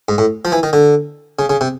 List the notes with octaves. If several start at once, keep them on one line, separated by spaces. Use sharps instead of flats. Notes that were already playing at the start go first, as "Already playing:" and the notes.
G#2
A2
F3
E3
D#3
D3
C#3
C#3
C3